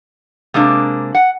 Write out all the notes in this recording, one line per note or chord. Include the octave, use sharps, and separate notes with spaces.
C3 G#3 A#3 D4
F#5